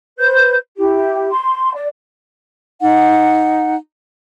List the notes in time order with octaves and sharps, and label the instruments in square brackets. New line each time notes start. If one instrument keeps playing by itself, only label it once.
[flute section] B4 C5 G6
E4 G4
C6
D5
D#4 F#5